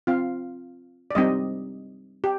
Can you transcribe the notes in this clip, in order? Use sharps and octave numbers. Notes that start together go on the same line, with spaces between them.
C4 F4 F5
D5
G3 C4 D#4 D#5
G4